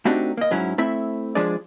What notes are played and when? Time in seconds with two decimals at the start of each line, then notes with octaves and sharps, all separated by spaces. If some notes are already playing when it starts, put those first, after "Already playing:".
0.05 A3 C4 D4 D#4 F#4 G4
0.37 A#3 D#5
0.51 G#2 F#3 C#4 E4
0.78 A3 C4 E4 E5
1.35 F3 G#3 D4 G#4 D5